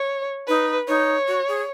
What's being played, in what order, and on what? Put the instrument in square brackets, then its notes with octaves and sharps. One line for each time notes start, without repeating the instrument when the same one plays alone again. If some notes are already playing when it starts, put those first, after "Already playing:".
Already playing: [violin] C#5
[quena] D#4 [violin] B4
[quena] D#4 [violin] C#5
[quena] F#4
G#4